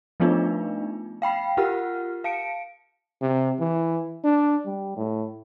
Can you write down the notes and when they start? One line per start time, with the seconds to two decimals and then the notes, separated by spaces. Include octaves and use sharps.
0.20 F3 A3 B3 D4 D#4 F4
1.22 F5 G5 B5 C7
1.57 F4 G4 A#4 F#5 F6
2.24 F5 A5 C#7 D7
3.21 C3
3.60 E3
4.24 D4
4.66 G3
4.96 A2